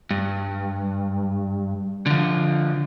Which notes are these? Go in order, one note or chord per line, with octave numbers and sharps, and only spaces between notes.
G2
D3 F3